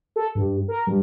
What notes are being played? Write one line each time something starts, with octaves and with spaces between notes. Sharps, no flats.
A4
G2
A#4
G2